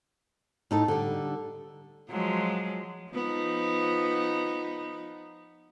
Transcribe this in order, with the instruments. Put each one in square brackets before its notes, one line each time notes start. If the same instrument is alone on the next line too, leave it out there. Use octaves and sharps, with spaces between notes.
[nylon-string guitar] A2 D#4 A4
D3 G3
[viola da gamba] F3 F#3 G#3
F3 B3 D#4